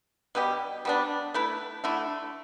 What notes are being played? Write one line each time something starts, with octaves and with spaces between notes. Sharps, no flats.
B2 G3 B3 G4
G3 B3 D4
A3 E4 B4
D3 A3 E4